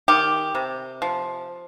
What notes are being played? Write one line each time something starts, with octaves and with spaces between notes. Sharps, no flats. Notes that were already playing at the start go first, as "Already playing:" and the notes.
D#3 G4
C3
F3